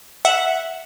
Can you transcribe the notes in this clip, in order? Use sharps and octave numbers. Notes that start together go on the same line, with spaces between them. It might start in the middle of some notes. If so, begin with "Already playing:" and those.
E5 F#5